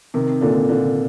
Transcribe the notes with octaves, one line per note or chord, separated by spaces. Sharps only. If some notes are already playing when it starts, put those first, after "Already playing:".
C3 D#3
A#2 D3
A#2 D3